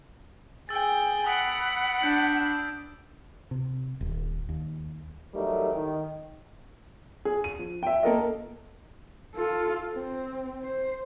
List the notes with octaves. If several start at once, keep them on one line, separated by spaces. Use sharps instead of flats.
G#4 G5 E6 A6
F#5 B5 D#6 D7
D4 G6
C3
D#1
D#2
E3 F#3 G3 A3 D#4 A#4
D#3
G#4
D#7
F3
E5 G5
A#3 A4 A#4 D#5
F4 A4
C4
C5